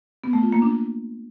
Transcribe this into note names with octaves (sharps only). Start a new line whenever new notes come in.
B3
A3
F4
A#3
D4